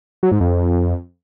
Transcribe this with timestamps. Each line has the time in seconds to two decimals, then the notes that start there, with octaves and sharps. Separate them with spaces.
0.23 F#3
0.32 G#2
0.40 F2